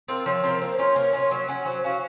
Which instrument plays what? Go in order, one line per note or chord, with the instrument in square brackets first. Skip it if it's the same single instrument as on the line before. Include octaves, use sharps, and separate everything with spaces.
[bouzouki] C4 F4 A#4
[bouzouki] F3 [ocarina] C#5
[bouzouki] C4 F4 A#4
[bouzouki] A#3 [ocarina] C5
[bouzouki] C#4 F4 [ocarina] C#5
[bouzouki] A#3
C#4 F4
F#3
C#4 F#4
[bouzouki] F#3 [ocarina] C5
[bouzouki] C#4 F#4 [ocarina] F5